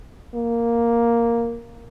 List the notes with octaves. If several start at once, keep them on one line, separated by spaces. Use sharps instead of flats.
A#3